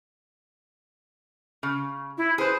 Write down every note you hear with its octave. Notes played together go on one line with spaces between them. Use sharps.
C#3
E4
G#4 B4 C5